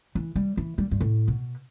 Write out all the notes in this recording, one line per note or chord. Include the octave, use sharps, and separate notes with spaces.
E3
G3
E3
G3
G2
A2
B2